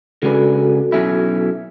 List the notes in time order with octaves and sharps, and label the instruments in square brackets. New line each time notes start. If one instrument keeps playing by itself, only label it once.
[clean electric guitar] C#3 G#3 D4 G#4 B4 [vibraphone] F#4 A4
[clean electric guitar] B2 F#3 C#4 E4